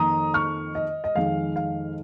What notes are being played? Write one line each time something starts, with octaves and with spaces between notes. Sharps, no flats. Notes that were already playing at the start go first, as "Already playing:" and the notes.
Already playing: F2 D#3 A#3 A#5 D#6
C#6 F6
D#5
D#5
F2 D#3 G#3 F5
F5